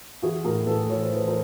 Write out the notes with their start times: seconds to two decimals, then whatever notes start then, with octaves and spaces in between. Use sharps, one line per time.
0.22 E3 F#4 G#4
0.45 A2 G#4 A#4
0.66 A2 A4 B4
0.89 E3 C#5
1.02 C5
1.11 E3 B4
1.28 A#4 C5